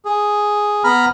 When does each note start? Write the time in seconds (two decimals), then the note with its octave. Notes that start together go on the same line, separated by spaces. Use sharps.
0.05 G#4
0.84 B3 A#5 B5 F6